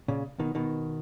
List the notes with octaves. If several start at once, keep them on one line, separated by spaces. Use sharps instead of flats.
A#2 C#3
B2 D#3
B2 D#3